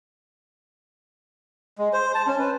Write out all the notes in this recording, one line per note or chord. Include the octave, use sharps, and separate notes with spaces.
G#3
C5
A5
C#4
B4